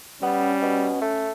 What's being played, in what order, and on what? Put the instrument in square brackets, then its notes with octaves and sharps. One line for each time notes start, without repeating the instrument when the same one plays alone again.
[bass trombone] G3 [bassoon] B3 [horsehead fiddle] C#4
[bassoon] B2
A3